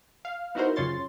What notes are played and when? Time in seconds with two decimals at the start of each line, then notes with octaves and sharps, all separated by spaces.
0.25 F5
0.55 B3 D#4 E4 F#4 A#4 C5
0.76 F#2 C#3 F4 C#5 C6 A6